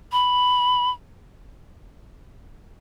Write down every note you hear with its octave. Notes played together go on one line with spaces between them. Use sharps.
B5